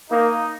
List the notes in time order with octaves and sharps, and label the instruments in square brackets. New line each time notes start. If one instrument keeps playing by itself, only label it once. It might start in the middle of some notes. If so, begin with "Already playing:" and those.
[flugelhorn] A#3 [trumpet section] D#4